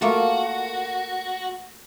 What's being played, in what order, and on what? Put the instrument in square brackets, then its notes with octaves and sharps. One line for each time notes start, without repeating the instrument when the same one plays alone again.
[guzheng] A3 A#3 F4 [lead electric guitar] F#4